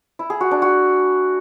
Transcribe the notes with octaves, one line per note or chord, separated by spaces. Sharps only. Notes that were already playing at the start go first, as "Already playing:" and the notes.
E4
G#4
F#4
D4
F#4